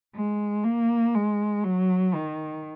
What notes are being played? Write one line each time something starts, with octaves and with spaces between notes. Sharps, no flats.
G#3
A#3
G#3
F#3
D#3